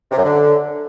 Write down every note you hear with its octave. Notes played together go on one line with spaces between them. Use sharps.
C3
F#2
D3